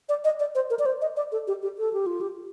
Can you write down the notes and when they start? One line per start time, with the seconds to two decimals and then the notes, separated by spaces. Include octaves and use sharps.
0.09 D5
0.24 D#5
0.40 D5
0.55 C5
0.70 A#4
0.79 D5
0.86 C5
1.01 D#5
1.17 D5
1.32 A4
1.47 G4
1.63 G4
1.79 A4
1.93 G4
2.06 F4
2.21 G4